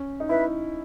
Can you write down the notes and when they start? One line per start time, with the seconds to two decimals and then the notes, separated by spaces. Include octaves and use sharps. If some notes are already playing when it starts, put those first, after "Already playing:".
Already playing: C#4
0.20 D#4
0.29 E4 B4 E5